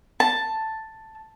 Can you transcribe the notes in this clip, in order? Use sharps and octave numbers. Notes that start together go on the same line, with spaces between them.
A5